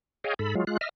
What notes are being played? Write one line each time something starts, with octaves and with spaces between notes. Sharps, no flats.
G#4 C#5 D#5 F5 G5
G#2 A4 B5
F#3 G#3 F4
G#3 F4 F#6
D#5 E5 F6